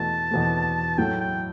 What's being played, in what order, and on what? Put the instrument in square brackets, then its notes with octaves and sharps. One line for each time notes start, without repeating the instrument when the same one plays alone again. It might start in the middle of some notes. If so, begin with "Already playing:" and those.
Already playing: [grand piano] E2 B2 A3 [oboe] A5
[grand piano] E2 B2 A3
[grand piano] A2 F#3 A3 [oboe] G5
[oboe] G5